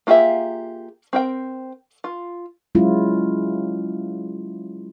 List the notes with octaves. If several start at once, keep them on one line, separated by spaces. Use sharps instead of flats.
A#3 F4 G4 G#4 E5
C4 A#4 G5
F4
F#3 G#3 C#4 E4 F4